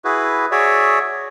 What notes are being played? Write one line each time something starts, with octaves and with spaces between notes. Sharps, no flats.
E4 F#4 G#4 B4
F#4 G#4 C#5 D5 E5